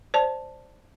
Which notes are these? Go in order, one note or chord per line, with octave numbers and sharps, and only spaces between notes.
C5 D5 A5